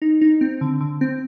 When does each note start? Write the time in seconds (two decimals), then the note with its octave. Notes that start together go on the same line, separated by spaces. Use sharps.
0.02 D#4
0.21 D#4
0.41 C4
0.61 D3
0.81 D3
1.01 C4